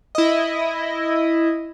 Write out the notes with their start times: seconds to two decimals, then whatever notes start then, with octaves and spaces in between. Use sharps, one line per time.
0.15 E4 D#5